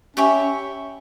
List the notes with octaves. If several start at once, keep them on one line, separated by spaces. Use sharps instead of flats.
C#4 G4 C#5 E5 B5